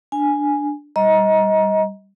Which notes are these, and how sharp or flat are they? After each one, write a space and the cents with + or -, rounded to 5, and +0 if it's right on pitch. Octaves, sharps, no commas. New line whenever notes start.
D4 +0 G#5 +0
G3 +0 D#5 +20 A#5 +25